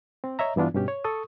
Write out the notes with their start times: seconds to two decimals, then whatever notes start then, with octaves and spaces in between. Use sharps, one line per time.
0.24 C4
0.39 C#5 D#5 E5 A#5
0.56 G2 E3 B3 D4 F4
0.74 G2 B2 C#4 G4
0.88 C#5
1.04 A4 C#6 D#6